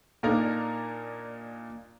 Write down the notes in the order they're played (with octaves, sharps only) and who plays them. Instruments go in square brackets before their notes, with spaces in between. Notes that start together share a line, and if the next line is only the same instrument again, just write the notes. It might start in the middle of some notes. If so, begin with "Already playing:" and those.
[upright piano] A#2 A#3 D4 D#4 A#4 A#5